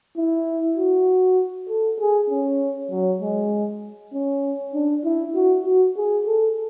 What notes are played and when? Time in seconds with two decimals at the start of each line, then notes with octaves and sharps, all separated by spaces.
0.17 E4
0.77 F#4
1.69 A4
2.00 G#4
2.30 C#4
2.91 F#3
3.22 G#3
4.13 C#4
4.74 D4
5.05 E4
5.35 F#4
5.65 F#4
5.97 G#4
6.27 A4